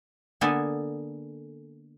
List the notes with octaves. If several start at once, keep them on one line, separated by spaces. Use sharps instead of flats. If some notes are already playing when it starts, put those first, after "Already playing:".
D3 A#3 B3 G#4 A4 G#5